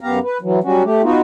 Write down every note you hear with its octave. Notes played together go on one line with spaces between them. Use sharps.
F#2 B3 G4 F5 A#5
B4
E3 F#3
F#3 G3 C#4 F#4
A3 G4
B3 D#4 F4 F#4